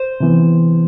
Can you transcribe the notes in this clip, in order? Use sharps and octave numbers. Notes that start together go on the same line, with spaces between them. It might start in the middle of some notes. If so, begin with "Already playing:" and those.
Already playing: C5
C3 E3 B3